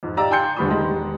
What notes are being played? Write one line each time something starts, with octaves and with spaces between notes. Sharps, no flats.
F2 G#2
G4 D5 D#5 F5 A#5 E6
G5 G#5 C6 G6 C#7
D#1 D3 G3 B5 C#6 D#6
E1 D#3 G#3 G4 D#5 C6